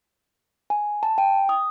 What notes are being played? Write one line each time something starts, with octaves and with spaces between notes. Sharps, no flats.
G#5
A5
G5
D#6